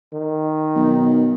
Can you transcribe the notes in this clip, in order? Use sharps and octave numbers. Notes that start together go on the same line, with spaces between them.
D#3
B1